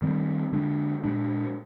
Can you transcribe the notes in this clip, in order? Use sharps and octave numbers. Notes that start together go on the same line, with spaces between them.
D#3 G3 C4
D3 G#3 D4
A#2 G#3 D4